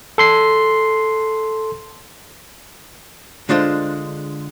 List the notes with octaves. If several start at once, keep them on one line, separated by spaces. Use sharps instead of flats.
A4 C6 C7
D3 G#3 D4 F4 C5